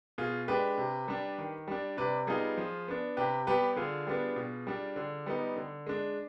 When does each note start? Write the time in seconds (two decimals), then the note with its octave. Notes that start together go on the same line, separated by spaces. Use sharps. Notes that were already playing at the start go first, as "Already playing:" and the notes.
0.18 B2 F4 G#4
0.48 G#3 D4 G4 B4
0.78 C3
1.08 G3 D4
1.38 D#3
1.68 G3 D4
1.97 C3 B4 D5
2.27 G3 B3 D#4 F4 G#4
2.58 F3
2.88 B3 D4
3.17 C3 G4 B4
3.47 G3 B3 G4 B4
3.76 D3 F4 G#4
4.07 G3 B3 D4
4.36 B2
4.67 G3 D4
4.96 D3
5.26 G3 B3 D#4
5.56 D3
5.86 G#3 D4